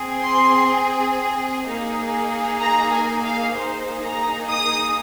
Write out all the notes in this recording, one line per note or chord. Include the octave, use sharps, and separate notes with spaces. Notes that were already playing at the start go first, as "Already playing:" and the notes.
Already playing: C4 G#4
C6
A#3 D#4 G#4
A#5
G#5
F5
A#3 D#4 G#4 C5
A#5
D#6